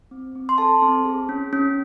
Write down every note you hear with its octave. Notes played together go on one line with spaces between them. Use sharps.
C4
C4
C6
A4 A5
C4
G#4
C#4
C#4